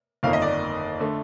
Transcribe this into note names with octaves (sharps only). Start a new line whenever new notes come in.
G1 F2 D#3 A#3 D#4 F5
D#5
D5
D3 A3